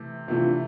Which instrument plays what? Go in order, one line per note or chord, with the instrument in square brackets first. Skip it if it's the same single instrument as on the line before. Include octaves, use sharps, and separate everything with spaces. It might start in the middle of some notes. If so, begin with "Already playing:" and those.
Already playing: [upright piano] C3 E3 A3
[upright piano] C3 E3 A3 [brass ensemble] D4 F4